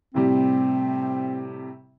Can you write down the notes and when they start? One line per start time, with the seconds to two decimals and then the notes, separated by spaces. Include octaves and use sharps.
0.14 A2 C3 G3 C4